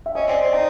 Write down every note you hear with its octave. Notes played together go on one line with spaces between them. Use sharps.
E5
C#4 D#5
C4 D5
C4 C5
D#4